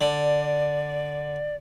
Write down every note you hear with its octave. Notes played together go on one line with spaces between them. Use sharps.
D3 D5